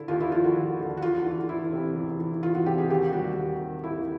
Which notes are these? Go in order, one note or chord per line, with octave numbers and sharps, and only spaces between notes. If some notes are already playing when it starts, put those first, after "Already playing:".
Already playing: D3 E4
D#2 F4
E4
F3 F4
F#4
D#2
D3
F#4
E2 F4
E3
E2 E4
C3
E2
E3
E2 F4
F#4
C3 G4
G#4
D#2 G4
G3 F#4
D#2
D#3
D#2 E4